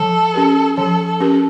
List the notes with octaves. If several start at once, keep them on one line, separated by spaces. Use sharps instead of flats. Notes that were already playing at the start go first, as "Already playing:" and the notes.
Already playing: F3 A4
C#4 G4 A#4
F3 A4
A4
C#4 G4 A#4